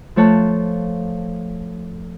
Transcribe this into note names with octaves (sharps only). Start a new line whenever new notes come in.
F3 A3 C#5 A5 F#6